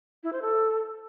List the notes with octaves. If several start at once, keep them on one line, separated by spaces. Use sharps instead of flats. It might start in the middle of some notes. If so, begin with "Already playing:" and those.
E4
C5
A4